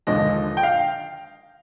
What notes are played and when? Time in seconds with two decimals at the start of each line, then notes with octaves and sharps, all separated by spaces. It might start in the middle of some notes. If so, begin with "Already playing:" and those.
0.07 D#2 D3 F3 G#3 D#5
0.57 G5
0.63 F5